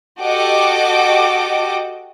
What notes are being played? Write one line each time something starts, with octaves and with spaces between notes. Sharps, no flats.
F#4 G4 A4 D#5 G5 D6